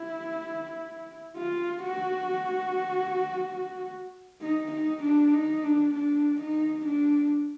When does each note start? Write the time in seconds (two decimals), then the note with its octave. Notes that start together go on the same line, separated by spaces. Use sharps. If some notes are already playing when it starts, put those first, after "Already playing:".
Already playing: E4
1.36 F4
1.83 F#4
4.41 D#4
4.72 D#4
5.04 D4
5.34 D#4
5.64 D4
5.95 D4
6.41 D#4
6.86 D4